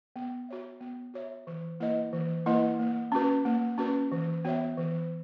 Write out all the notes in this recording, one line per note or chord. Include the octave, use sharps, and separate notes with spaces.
B3
F#4 C#5 E5
B3
F#4 C#5 E5
E3
A#3 E4 B4 D#5
E3
A#3 E4 B4 D#5
A#3
C#4 F#4 B4
A#3
C#4 F#4 B4
E3
B3 F#4 C#5 E5
E3